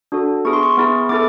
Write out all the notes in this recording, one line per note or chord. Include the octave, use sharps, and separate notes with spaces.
D4 F#4 A4
B3 E4 G#4 C#6
C6
C#6
B3 E4 G#4
B3 E4 A4 D6